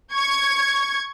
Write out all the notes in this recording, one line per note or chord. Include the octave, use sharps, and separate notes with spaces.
C#6 G#6